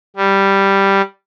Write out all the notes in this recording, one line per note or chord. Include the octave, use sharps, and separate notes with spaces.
G3